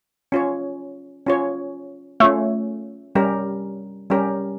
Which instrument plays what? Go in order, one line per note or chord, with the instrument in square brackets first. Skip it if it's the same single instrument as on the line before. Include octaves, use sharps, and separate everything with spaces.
[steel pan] C#4 F4 C#5
C#4 F4 C#5
[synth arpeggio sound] A3 [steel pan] C#4 F4 C#5
[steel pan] G3 C#4 G4 A#4
G3 C#4 G4 A#4